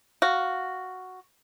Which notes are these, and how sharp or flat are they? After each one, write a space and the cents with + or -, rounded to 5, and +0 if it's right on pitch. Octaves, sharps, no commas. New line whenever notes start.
F#4 +0 F5 +0